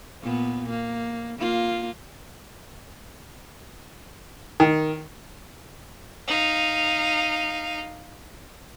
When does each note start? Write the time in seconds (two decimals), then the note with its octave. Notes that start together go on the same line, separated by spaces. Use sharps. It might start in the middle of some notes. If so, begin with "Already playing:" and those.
0.23 A#2 B3
0.69 A#3
1.39 A#3 F4
4.60 D#3
6.28 D#4 F5